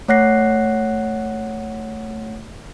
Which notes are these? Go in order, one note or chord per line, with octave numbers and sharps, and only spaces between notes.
A3 C#5 F#5 F#6 A#6 C7